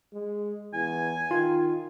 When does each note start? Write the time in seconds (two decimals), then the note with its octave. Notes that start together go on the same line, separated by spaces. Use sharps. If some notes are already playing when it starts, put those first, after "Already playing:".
0.13 G#3
0.74 E2 G#5
1.31 D#3 F4